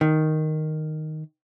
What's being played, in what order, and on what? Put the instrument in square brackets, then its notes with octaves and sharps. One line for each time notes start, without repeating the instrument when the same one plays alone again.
[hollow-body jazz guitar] D#3